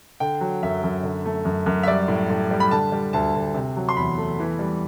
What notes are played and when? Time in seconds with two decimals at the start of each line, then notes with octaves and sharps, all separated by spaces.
0.20 D3 G5
0.41 F#3
0.63 F#2 E5
0.84 F#2
1.03 D3
1.26 A3
1.45 F#2
1.66 F#2
1.83 E5
1.88 G3 D5
2.08 A2
2.30 A2
2.51 G3
2.60 B5
2.71 D3 A5
2.92 G3
3.13 D2 A5
3.35 D2
3.54 C3
3.76 F#3
3.89 C6
3.97 E2 B5
4.18 A3
4.39 E3
4.59 G3